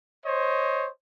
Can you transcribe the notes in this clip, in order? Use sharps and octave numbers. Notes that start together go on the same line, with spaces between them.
C5 C#5 D#5